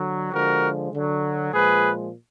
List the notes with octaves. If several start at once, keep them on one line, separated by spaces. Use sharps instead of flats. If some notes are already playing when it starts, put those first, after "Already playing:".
Already playing: D3 F#3
D3 F3 G#3 F#4 A#4
D3 F#3
A#2 F3 G#3 G#4 B4